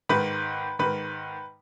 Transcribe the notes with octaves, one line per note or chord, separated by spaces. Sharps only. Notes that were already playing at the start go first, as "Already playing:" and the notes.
G#2 D#3 B4 B5
G#2 D#3 B4 B5